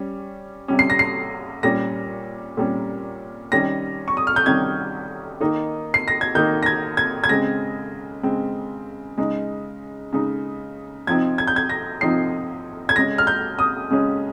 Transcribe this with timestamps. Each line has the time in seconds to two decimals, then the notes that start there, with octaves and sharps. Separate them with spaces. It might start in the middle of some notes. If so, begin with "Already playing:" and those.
Already playing: G3 C#4
0.68 C3 G3 C#4
0.79 C7
0.90 A#6
0.99 C7
1.63 A#2 G3 C#4 A#6
2.57 A#2 G3 C#4
3.52 C3 D#3 G3 C#4 A#6
4.08 C#6
4.17 D#6
4.27 F6
4.36 G6
4.46 C3 D#3 G3 C#4 G#6
5.41 D#3 A#3 D#4
5.94 C7
6.08 A#6
6.21 G#6
6.35 D#3 A#3 D#4 G6
6.63 A#6
6.66 G#6
6.97 G#6
7.24 G#6
7.29 C#3 G#3 C4 A#6
8.23 C#3 G#3 C4
9.18 C#3 G#3 D#4
10.13 C#3 G#3 D#4
11.07 C3 F3 C4 D#4 G#6
11.38 G#6
11.47 G6
11.56 G#6
11.70 A#6
12.01 C3 F3 C4 D#4 C7
12.89 G#6
12.96 C#3 G#3 C#4 A#6
13.18 F6
13.27 G6
13.59 D#6
13.91 C#3 G#3 C#4